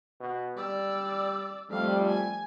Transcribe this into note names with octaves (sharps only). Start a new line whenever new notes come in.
B2
G3 D5 E6
F2 F3 G3 A3 F5
G#5